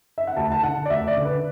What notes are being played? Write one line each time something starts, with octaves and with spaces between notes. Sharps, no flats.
E5
F#5
D2 A5
A5
D3 F#5
D5
D2 E5
D5
D3
B4